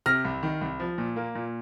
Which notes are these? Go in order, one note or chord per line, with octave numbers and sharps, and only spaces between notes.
C3 F6 A#6
C2
D#3
C2
F3
A#2
A#3
A#2